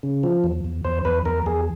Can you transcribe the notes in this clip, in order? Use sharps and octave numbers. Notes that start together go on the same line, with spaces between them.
C#3
F3
E2
E2
E2 C5
E2 B4
E2 A#4
E2 G#4